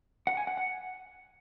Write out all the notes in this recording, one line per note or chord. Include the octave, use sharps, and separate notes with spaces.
F#5
G#5
F#5
F#5